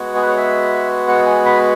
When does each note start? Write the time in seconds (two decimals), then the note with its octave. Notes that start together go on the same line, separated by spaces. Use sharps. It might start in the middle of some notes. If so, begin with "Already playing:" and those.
Already playing: G#3 B3 F#4
0.15 G#4
0.22 B4
0.28 C#5
0.37 E5
1.08 F#5
1.26 G#5
1.46 B5